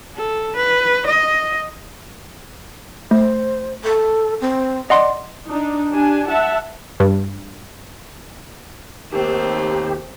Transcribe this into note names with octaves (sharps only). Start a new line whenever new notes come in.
A4
B4
D#5
A3 C5
A4
C4
D5 D#5 F#5 C6
D4 D#4
D4 G4 G#5
E5 F#5 A5
G2
D#2 A3 C4 G4